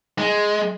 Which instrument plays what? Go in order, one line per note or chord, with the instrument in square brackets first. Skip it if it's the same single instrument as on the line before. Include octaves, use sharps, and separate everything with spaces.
[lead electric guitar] G#3